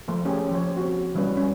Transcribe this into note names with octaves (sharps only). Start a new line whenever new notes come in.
F3 A3 A#3
A#3 C#4 G4 G#4
F3 C#5
C4 F#4
E3 G3 B3 C#4 B4
C#4